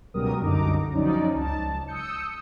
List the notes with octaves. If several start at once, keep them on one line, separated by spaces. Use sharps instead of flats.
C#2 B2 F#3 G3 A#4 D#6
C2 F#2 D3 D#4 A#5 D6
F3 F#3 C#4 D#4 D5
C#2 A5
D#6 E6 G6 C#7